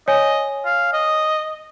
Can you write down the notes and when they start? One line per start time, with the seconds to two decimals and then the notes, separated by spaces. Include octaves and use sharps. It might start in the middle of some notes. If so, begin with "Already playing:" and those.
0.08 C#5 D#5 G#5
0.65 F5
0.93 D#5